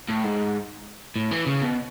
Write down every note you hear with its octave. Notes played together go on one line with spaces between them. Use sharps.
A2
G#2
A2
E3
C#3
B2